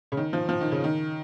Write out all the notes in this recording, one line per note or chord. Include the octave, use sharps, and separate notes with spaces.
C#3
D#3
F3
F3
D#3
C#3
D#3